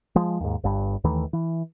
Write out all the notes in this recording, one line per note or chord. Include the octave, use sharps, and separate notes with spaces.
F3 G#3
D#2 G#2
G1 G2
D#2 D#3 E3 A3
E3